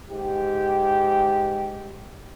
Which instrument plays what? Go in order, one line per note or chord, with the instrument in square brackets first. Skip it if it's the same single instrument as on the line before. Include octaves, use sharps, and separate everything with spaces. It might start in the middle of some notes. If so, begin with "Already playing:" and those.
[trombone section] G#2 G4